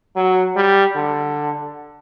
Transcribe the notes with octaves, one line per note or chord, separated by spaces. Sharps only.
F#3
G3
D3